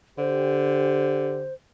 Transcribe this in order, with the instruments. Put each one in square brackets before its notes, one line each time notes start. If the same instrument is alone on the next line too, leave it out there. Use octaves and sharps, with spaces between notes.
[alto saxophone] D3 [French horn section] G4 [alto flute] C5